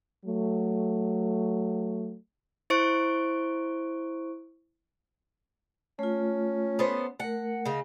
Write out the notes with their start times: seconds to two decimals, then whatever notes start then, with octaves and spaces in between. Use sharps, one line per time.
0.25 F#3 A3
2.70 E4 C5 C#6 D7
5.99 A3 C#4 F4
6.79 B3 A4 C5
7.20 A3 A#4 F#5
7.66 C#3 D#4